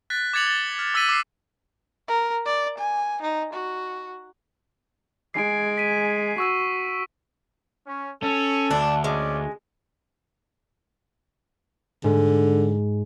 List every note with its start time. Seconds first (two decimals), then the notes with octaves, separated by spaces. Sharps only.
0.10 F#6 A6 B6
0.33 D6 G#6 A6 C#7 F7 F#7
0.46 A6 G7
0.79 F6
0.94 D6 E6 A6 B6 D#7
1.09 D6 C7
2.08 A#4
2.46 D5
2.78 G#5
3.22 D#4
3.53 F#4
5.34 G#3 G#5 C7 D7
5.78 B6 D#7
6.38 F#4 C#6 E6 D#7
7.87 C#4
8.23 C#4 A4
8.71 D2 D4
9.04 G#3 C#4 D5
12.04 G#2 D3